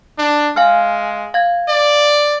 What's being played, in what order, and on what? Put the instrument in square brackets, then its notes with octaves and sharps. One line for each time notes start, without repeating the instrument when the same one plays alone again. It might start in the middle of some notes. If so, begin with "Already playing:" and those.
[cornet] D4
[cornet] G#3 [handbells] F5 G#5 F6
[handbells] F5 G#6
[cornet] D5